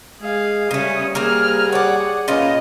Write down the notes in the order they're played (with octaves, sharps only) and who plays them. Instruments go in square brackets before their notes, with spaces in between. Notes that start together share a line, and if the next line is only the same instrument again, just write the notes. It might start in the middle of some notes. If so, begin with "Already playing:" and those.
[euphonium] G#3 [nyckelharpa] G#4 F5
[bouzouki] C#3 A3 [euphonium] G3 [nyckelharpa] C#4 [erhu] D#6
[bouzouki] A#3 C4 A#4 [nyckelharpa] G#4 [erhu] F6
[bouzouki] C#5 D5 [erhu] F#5
[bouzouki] A#2 B3 F4 [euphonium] C#4 [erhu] D#5